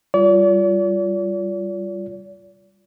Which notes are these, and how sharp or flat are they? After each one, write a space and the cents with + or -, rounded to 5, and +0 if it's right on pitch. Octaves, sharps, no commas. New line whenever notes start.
G3 +0 F4 +0 D5 -40